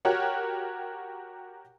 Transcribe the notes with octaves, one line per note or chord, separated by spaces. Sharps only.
F#4 G4 A#4 C#5 F#5